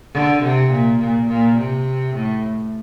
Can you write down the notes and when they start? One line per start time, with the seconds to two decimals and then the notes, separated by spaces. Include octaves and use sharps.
0.14 D3
0.42 C3
0.70 A#2
0.99 A#2
1.28 A#2
1.57 C3
2.15 A2